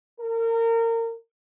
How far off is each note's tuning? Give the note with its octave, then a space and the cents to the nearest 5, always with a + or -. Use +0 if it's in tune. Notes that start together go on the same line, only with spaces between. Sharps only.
A#4 -30